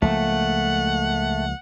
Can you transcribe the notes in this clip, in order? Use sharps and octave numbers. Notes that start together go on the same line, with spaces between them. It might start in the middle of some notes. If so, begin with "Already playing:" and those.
C#2 F3 A3 A#3 F#5